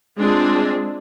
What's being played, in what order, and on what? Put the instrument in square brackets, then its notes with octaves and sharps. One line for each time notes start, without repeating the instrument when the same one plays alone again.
[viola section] G#3 C4 D4 F4 G#4